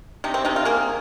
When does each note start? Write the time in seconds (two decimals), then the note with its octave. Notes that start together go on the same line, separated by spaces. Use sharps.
0.24 C3 D#4
0.34 C4
0.45 C3 D#4
0.56 F4
0.65 A#3 G#4